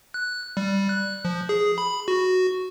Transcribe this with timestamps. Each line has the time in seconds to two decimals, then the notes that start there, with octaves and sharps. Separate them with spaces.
0.14 F#6
0.57 G3
0.89 F#6
1.25 F3
1.49 G#4
1.78 B5
2.08 F#4